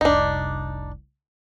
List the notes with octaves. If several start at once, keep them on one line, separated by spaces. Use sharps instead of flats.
F1 C2 D4 D#4